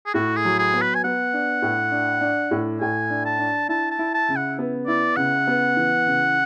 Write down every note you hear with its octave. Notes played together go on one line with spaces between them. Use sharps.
G#4
A2 F#4
G#4
F#3
G#4
B3
B4
G#5
B3 F#5
D4
A2
D4
D4
A2
A2 G#5
D4
A5
D4
E4 A5
A5
E4
A5
C#3
F#5
B3
E4 D5
C#3 F#5
B3
E3
C#3